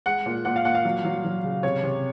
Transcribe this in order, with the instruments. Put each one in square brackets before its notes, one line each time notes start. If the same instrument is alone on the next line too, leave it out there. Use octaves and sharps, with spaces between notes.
[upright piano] G#3 F#5
A#2
A#2 F#5
F5
A#2 F#5
F5
F#3
F#3
F#3
C#3
C3 C#5
C3